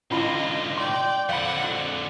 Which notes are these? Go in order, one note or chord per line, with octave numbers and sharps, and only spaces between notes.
G#2 D3 C#4 E4 F4 D#5 B5
D5 G5 C6
F2 D3 F5 F#5 B5
F#4